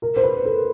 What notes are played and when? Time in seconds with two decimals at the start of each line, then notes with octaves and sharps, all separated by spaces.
0.02 A#4
0.16 C5
0.23 B4
0.45 A4